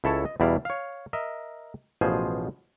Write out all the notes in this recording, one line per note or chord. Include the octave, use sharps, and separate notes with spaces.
C#2 E4 A4 C#5 A5
D#5
E2 B2 G3 E4 D5 F5
C#5 F5
A#4 D#5 E5
A1 B2 F3 G#4 C5 G#5